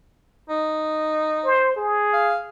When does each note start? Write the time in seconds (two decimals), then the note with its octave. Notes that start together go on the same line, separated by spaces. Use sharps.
0.49 D#4
1.45 C5
1.76 G#4
2.13 F5